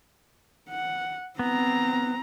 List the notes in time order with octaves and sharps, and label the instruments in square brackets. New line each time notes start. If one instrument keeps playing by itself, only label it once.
[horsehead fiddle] F#5
[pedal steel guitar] B3 [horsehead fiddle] C4 A#5